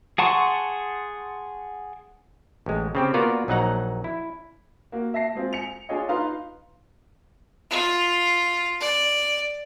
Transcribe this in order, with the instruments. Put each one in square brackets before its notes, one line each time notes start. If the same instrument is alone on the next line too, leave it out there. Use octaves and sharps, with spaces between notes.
[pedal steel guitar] G#4 F#5 A5 C6 C#6
[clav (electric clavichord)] A1 G#3
C#3 C4 G4
A#3 B3 F4 F#4 A#4 D5
A#1 F#3 D#4 F#5 A#5
E4
[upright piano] A#3 F#4
E5 A5 A#6 C7
G#3 C4 F4
G#5 C#7 F7
D4 F4 G#4 C#5 D#5
D#4 F4 B4 F5 A#5 C6
[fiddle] F4
D5